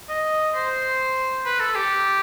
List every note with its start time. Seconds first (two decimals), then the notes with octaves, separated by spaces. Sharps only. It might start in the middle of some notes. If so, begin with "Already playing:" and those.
0.09 D#5
0.54 C5
1.45 B4
1.60 A4
1.75 G4